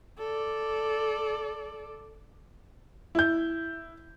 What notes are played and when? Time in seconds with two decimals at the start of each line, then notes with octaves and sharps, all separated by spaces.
0.18 A4 D5
3.15 E4 G6